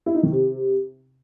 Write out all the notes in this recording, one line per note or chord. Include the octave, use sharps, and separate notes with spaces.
E4
D#4
D#3
C3